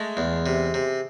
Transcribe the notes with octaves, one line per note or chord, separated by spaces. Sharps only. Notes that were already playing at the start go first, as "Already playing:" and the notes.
Already playing: G#3 A3
E2
C3
C3